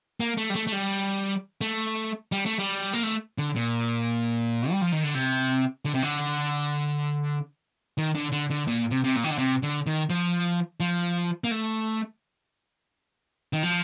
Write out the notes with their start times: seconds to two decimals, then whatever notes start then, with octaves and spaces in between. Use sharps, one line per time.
0.20 A#3
0.37 A3
0.50 G3
0.55 A3
0.67 A3
0.72 G3
1.61 A3
2.32 G3
2.46 A3
2.59 G3
2.93 A#3
3.03 A3
3.38 D3
3.56 A#2
4.71 G3
4.82 F3
4.92 D#3
5.03 D3
5.15 C3
5.85 D3
5.94 C3
6.02 D3
7.98 D#3
8.15 D3
8.32 D3
8.50 D3
8.67 A#2
8.91 C3
9.04 C3
9.16 A#2
9.24 D#3
9.31 D3
9.38 C3
9.63 D3
9.86 D#3
10.10 F3
10.80 F3
11.44 A#3
11.51 A3
13.53 D#3
13.63 F3